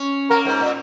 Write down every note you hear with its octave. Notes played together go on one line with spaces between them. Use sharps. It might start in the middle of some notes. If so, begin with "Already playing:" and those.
Already playing: C#4
A#3 A#4
G#2
A#2